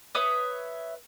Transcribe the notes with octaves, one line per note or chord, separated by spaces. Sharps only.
B4 C#5 E5 D#6